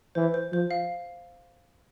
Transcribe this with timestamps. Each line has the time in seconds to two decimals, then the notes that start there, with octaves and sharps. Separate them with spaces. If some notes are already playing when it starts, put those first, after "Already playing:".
0.15 E3 C5
0.34 C5
0.52 F3 C5
0.71 F5